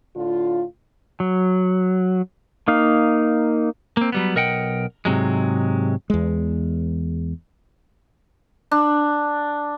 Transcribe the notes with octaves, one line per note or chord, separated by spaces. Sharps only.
A2 D3 F4
F#3
A#3 D#4 F5
A#3 C4
F#3 G3 B3
B1 A#4 D#5 F#5 G5
G#2 C3 F#3 G#3
E2 G#3
D4